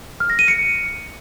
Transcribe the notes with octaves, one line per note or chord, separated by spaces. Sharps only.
F6
A#6
D#7
C#7